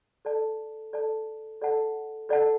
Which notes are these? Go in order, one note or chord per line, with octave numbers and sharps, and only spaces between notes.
A4 D5 A5
A4 D5 A5
A4 D5 F#5 A5
A4 D5 F#5 A5